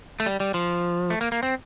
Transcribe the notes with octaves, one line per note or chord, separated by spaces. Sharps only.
A3
G3
G3
F3
A3
A#3
A#3
C4